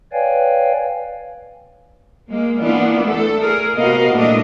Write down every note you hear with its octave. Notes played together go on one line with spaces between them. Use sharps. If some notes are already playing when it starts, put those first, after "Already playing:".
B4 C#5 D5 F5 G5 G#5
G#3 A#3
E3 A#3 B3 D4 E4 F4
A3 A4
G#4 A#4
C3 B3 F#4 A#4 D#5 F5
A#2 E3 G#3 A3 D4 D#5